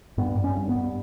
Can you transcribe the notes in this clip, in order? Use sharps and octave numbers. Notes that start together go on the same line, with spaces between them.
G2 B3
G2
C#4
G2
B3
G2